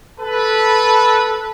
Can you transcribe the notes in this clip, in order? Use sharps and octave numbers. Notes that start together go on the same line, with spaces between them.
A4 B4